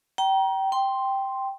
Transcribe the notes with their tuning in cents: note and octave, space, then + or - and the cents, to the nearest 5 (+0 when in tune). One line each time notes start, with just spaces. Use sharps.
G5 -25 A#5 +25
G5 +0 C6 +0